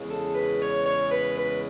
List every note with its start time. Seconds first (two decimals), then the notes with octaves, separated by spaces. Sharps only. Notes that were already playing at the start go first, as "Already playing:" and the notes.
Already playing: E2 C#3 G#3
0.09 A4
0.35 B4
0.59 C#5
0.85 C#5
1.10 B4
1.35 B4